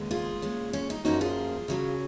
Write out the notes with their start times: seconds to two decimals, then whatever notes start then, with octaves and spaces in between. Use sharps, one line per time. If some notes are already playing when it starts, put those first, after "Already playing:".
Already playing: D#2 C#3 G#3 B3
0.11 F4 G#4
0.42 A#2 G#3 C#4
0.73 C#4
0.90 D#4
1.05 F#2 F3 A#3 C#4 D#4 F#4
1.21 F4 G#4
1.68 C#3 F#3 C#4